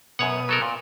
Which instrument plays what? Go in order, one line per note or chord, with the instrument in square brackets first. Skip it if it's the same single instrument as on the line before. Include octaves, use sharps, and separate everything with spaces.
[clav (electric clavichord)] F#2 C#5 F#5 [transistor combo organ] B2 D#6
[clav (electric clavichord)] F#3 A4 A#4
A#2